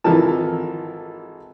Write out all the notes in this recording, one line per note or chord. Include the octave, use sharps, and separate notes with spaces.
G#1 E3 F3 A4 A#4 A5